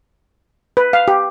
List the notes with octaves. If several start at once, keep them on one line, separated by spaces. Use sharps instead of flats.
B4
F5
G4